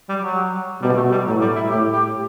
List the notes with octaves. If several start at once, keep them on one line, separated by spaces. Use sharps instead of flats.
G3
F#3
B2 G3
A3
G3
A2 F#3
G3
E4
A2 G4
G4